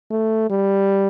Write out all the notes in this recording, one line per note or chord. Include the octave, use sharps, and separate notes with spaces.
A3
G3